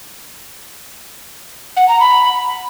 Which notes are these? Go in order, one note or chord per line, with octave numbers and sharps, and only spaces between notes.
F#5
A#5
B5